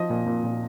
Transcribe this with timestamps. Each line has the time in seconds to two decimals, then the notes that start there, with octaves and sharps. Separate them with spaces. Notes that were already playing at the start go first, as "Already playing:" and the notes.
Already playing: F3 D#5
0.10 A#2
0.27 A#2
0.44 A#2